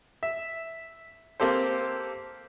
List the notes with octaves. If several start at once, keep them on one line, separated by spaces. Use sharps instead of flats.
E5
A#3 C4 G4 A4 C5